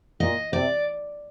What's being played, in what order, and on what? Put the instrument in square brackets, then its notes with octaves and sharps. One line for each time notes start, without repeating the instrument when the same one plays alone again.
[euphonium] A#2 [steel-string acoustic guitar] D#5
[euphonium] C3 [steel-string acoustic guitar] D5